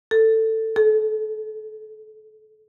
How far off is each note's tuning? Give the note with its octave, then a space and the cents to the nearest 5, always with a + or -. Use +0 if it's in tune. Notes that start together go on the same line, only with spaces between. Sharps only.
A4 +15
A4 -30